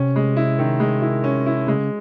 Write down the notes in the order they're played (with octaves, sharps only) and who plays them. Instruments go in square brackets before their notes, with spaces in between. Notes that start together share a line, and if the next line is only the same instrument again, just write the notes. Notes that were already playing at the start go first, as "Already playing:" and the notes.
Already playing: [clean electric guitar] C3 [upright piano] C#4
[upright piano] G#3
E4
D#3
G#3
E4
C#4
E4
[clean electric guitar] C#3 [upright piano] G#3